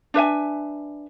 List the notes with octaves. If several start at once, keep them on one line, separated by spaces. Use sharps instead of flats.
D4 B4 E5 G#5